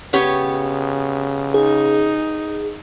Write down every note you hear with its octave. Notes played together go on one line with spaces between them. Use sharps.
C#3 B3 G4 C#5
D#4 G#4